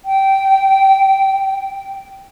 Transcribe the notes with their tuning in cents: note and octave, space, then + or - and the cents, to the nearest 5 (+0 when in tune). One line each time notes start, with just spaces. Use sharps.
G5 -15